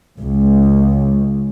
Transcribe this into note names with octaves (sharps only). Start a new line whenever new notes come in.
C#2